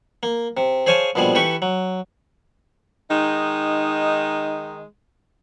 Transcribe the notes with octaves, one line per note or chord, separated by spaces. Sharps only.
A#3
C3
G#4 C5 C#5 F5 G#5 A5
A#1 B2 F3 G3 G#4
E3 G4 A4 B4 C#6
F#3
D#3 G#3 D#4